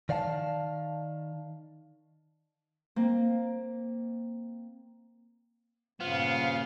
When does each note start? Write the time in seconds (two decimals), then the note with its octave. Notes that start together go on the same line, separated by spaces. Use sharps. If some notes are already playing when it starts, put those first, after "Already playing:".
0.09 D#3 D5 F5 F#5 A5
2.96 A#3 C4
6.00 G2 A#2 C#3 B3 F4 C5 F5